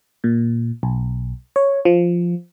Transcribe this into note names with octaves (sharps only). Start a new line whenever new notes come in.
A#2
B1
C#5
F3